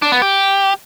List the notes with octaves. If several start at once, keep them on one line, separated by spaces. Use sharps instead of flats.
D4
B3
G4